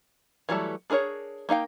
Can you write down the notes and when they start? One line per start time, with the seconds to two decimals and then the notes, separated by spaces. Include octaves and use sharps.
0.49 E3 F#3 G3 A3 A5
0.90 D4 G#4 A#4 B4 C#5
1.49 A#3 D#4 F5 G5